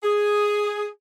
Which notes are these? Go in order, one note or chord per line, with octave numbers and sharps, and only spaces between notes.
G#4